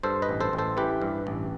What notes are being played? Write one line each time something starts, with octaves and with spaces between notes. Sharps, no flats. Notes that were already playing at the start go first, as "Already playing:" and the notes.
G2 A4 C5
B4 D#5
A1
A4 C5
A1
A4 C5
E3 G4 B4
G2
A1